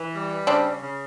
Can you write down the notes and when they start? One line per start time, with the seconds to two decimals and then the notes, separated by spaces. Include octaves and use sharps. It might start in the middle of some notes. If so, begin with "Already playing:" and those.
Already playing: E3
0.14 G3
0.47 C#3 C4 D4
0.82 C#3